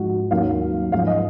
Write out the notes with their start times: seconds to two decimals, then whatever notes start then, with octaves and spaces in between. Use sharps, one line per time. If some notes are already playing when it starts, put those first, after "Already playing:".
Already playing: G#2 F3 G#3 F#4
0.31 D#2 D#3 F#3 A#3 F5
0.92 G#2 F3 G#3 F5
1.07 D#5